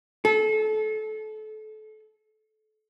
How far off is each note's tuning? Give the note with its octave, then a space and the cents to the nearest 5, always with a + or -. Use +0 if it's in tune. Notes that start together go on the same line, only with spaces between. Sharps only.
A4 -30